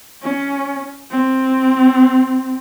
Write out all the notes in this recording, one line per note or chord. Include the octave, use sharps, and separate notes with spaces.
C#4
C4